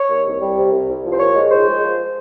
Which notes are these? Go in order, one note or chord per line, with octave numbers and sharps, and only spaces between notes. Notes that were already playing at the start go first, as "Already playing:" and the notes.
Already playing: C#5
D#2
C2
G3
C3
C2
C2
F3
C5
A#2 C#5
G#3
G#2 C5
G#3
F3